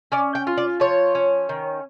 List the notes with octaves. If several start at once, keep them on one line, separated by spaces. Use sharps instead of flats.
C#4 D5
G5
F4
D5
F3 C#5
C#4
D#3